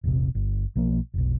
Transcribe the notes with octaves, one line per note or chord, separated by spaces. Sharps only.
E1 A#1 C3
G1
B1 F3 A#3
F1 B1